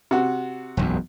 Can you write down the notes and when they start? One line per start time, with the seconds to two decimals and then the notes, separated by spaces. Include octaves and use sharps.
0.11 C3 F#4
0.77 E1 B1 F#2